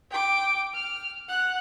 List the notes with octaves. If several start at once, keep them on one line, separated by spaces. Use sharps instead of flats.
G5 D6
F6
F#5 F#6